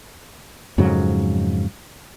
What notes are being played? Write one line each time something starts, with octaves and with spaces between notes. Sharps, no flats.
F2 G#2 C#3 F#3